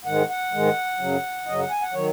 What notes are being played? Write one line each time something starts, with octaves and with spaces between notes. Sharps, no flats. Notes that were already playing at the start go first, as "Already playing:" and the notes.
G#2 D#3 G#3 F#5
F#5
G#2 D#3 G#3
F#2 C#3 F#3
F#2 C#3 F#3 D#5
F#5
G#5
F#5
D#3 F#3 C#5